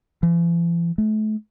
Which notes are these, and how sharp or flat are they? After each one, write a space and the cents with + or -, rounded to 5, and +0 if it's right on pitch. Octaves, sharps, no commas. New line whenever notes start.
E3 +45
A3 -35